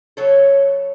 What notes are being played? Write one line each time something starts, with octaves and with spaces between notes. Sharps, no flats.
C#3 F#3 C#4 A4 C#5